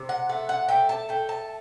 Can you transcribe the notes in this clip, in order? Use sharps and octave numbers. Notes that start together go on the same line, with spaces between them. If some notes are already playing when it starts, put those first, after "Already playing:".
Already playing: C3
F#5
A3 F#5
F#5
A3 G5
A5
A3 G5
A5